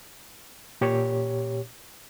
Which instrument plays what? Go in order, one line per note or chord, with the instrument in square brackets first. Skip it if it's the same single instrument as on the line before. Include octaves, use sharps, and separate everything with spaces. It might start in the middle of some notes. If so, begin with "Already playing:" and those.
[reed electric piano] A#2 G4 C#5